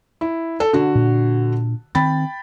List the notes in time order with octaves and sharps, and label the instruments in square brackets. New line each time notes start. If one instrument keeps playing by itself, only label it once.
[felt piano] E4
A4
D3 F#4
[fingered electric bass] A#2 D4
[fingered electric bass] D#3 C4 [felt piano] G5 B5 A6